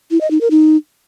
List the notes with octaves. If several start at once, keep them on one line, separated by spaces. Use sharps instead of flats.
E4
D#5
D#4
A#4
D#4